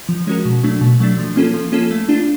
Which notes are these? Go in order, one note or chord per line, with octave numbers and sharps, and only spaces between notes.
F3
G#3 C#4 F#4 A#4
B2
F#3 A3 D4
B2
F#3 A3 D4
F3
A#3 C#4 F4 A4
F3
A#3 C#4 F4 A4
A3
D4 F4